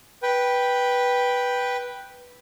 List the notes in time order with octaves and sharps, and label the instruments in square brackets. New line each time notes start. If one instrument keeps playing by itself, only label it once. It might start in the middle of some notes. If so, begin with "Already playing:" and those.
[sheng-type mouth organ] B4 G5